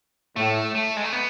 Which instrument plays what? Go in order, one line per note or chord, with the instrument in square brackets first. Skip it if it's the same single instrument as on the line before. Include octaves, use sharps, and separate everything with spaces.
[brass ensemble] A2 [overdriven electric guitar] A3
[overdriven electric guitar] A3
G#3
A3
B3